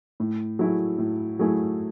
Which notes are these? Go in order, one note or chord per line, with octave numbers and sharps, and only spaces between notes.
A2
F#3 A3 E4 G#4
A2
F#3 A3 E4 G#4